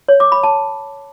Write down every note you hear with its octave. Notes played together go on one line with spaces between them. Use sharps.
C#5
D6
B5
A5